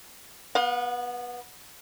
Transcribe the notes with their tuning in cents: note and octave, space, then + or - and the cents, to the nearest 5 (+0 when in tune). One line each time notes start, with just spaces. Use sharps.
B3 -15 F5 +35